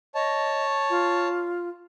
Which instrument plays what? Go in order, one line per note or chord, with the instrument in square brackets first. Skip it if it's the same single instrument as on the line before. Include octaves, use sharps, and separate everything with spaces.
[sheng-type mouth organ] C#5 A5 [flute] D#5
[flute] F4